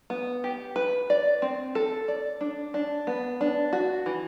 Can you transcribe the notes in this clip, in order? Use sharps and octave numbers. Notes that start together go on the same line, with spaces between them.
B3
G4
B4
D5
C4
A4
D5
D4
D4
B3
D4
F#4
E3